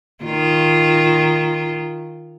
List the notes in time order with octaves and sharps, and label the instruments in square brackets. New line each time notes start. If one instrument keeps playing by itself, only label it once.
[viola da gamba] D#3 F4